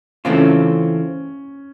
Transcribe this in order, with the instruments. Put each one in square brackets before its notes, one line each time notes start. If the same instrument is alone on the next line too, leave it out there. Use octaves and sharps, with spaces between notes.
[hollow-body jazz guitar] C#3 E3 A3 C4 F4 [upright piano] C#4